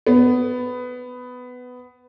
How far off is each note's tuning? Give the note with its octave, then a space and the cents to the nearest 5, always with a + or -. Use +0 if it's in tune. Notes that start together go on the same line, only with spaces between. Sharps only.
B3 +15